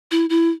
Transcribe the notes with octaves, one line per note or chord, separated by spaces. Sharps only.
E4
E4